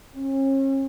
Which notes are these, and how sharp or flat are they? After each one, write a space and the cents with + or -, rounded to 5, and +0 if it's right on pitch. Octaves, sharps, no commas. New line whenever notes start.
C#4 -40